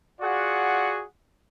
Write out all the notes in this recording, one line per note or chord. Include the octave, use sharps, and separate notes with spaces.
F4 F#4 G#4 D5 F#5